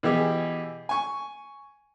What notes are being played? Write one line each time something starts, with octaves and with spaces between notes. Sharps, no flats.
B2 E3 G4 G#4
G#5 C#6